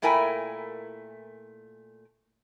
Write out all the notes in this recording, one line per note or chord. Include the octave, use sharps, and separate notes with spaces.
A#2 A3 E4 A#4 G5 G#5